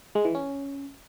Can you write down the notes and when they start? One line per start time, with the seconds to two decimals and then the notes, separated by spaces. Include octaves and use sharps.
0.15 G#3
0.25 E3
0.35 C#4